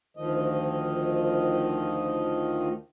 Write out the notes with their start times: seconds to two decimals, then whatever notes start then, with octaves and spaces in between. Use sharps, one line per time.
0.17 D2 D#3 F3 D#5